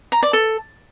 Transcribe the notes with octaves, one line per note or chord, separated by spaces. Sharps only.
A#5
D5
A4